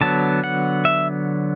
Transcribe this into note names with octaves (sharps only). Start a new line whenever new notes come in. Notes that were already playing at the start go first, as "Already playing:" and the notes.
D3 F#3 B3 A5
F#5
E5